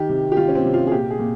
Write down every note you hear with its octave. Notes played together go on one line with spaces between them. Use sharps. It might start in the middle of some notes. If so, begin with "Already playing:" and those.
Already playing: D#3 G4
C3
G4
D#3 F4
C#4
C4
C3
F4
G#4
A#2 G4
G#4
A#2